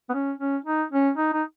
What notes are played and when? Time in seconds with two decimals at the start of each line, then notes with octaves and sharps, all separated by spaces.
0.09 B3
0.14 C#4
0.39 C#4
0.65 D#4
0.92 C#4
1.17 D#4
1.33 D#4